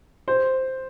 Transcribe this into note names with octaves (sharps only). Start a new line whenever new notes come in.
C5